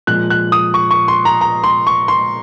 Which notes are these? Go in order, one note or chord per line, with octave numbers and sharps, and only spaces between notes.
A#2 F3 G#3 F#6
F#6
D#6
C#6
C#6
C6
A#5
A#5
C6
C#6
C6